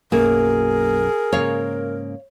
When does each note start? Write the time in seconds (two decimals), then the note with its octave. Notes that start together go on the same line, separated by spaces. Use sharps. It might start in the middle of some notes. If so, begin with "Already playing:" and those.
0.12 B1 F#2 A#3 G#4 A#4
1.32 G#2 C#3 A#3 C#5 F5